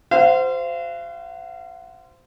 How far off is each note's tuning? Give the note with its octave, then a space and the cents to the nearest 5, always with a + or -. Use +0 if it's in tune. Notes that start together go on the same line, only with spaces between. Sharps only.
F#4 +0 C5 -15 F5 -40